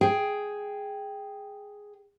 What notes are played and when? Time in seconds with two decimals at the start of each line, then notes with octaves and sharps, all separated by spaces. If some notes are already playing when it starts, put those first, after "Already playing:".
0.01 G#4 G5